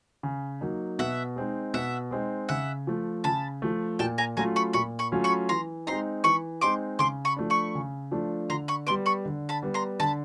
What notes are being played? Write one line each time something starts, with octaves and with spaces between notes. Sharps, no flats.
C#3
F#3 A#3 D#4
B2 E5 F#5
G#3 C4 D#4
B2 E5 F#5
G#3 C4 D#4
C#3 E5 F#5
F3 A3
C#3 A5 B5
F3 A3
A#2 G5 A5
G#5 A#5
F#3 A3 C#4 F4 G#5 A#5
B5 C#6
A#2 B5 C#6
B5 C#6
F#3 A3 C#4 F4
B5 C#6
E3 A#5 C6
G#3 C4 D#4 A#5 C6
E3 B5 C#6
G#3 C4 D#4 C6 D6
C#3 C6 D6
B5 C#6
F3 A3 D4
B5 C#6
C#3
F3 A3 D4
D3 A#5 C6
B5 C#6
G3 B3 C6 D6
B5 C#6
D3
A5 B5
G3 B3
A#5 C6
D3 A5 B5